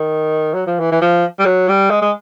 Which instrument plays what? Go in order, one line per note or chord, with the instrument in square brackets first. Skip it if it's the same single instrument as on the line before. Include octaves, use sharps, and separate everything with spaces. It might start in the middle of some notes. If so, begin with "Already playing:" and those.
Already playing: [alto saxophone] D#3
F#3
F3
E3
E3
F3
G3
F#3
G3
G#3
G#3